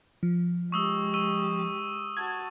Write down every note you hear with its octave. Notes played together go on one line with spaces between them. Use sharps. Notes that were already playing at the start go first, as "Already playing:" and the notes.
F3
G#3 G4 C#6 D#6 E6
C#6 E6 D#7
F#4 A5 G#6